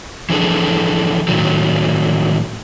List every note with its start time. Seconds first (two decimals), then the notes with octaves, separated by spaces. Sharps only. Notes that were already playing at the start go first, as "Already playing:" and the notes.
0.30 E3 F3 D4 G#4 A4
1.28 A2 D#3 F#3